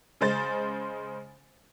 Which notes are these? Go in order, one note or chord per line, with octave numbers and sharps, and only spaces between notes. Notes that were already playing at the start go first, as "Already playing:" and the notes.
C#3 G#3 C5 A6